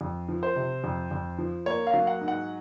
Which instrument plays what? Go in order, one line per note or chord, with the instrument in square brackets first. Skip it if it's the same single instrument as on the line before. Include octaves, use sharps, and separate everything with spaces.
[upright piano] F2
F3
C5
C3
F2
F2
F3
A#3 C#5
F5
F#3
F#5
G#2
F#5